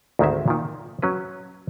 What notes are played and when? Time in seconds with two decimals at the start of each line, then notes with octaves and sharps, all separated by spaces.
0.19 D2 G#2 D#3 G#3 C4 E5
0.48 A#2 D#3
1.02 F#3 C#4 B4